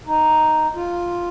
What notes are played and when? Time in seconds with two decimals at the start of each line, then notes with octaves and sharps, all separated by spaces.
0.07 D#4
0.75 F4